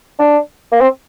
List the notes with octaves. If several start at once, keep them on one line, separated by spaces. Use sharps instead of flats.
D4
A#3
C4